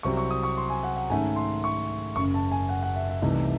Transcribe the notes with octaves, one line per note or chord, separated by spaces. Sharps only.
C2 C3 F#3 C4 C#6
C#6
D#6
C#6
C6
G#5
F#5
F#5
G#2 D#3 A3 C#4 G#5
C6
C#6
F#1 F#2 C#3 C#6
A5
G#5
F#5
F#5
E5
E5
C2 C3 E3 A3 D#4